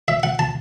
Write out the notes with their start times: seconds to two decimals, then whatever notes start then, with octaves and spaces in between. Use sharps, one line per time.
0.08 E5
0.23 F#5
0.39 A5